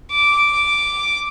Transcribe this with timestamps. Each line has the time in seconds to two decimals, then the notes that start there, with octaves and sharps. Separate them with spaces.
0.11 D6